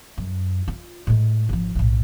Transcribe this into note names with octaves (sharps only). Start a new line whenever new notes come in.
F#2
F4
A2 G#3
G#1 F3
B1 A2